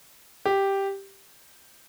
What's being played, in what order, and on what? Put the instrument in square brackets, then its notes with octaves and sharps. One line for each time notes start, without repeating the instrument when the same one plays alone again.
[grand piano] G4